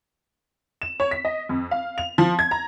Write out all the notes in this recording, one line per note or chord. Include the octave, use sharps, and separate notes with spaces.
E7
C#5
B6
D#5
F2
F5
F7
F3
G#6
A#5